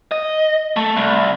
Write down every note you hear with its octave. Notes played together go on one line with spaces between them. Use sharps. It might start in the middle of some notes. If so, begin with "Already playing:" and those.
D#5
A3
C2